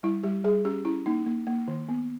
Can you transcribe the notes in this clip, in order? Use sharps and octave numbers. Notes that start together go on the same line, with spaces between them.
G3 E4
G3 G4
G3 G#4
C#4 G4
C#4 E4
A#3 D#4
A#3
A#3
D#3
B3